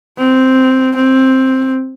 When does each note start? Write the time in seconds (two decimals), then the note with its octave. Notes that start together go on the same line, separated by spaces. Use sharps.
0.18 C4
0.96 C4